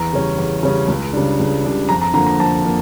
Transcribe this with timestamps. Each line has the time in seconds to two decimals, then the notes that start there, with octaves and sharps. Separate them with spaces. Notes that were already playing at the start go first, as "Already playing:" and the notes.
Already playing: E2 A#5
0.13 C#3 G3 C#4
0.38 E2
0.63 C#3 G3 C#4
0.88 C#2
1.13 C#3 G3 D4
1.39 C#2
1.65 C#3 G3 D4
1.89 F2 A#5
2.02 A#5
2.14 D3 F3 A#3 A#5
2.27 A#5
2.40 F2 A5
2.65 D3 F3 A#3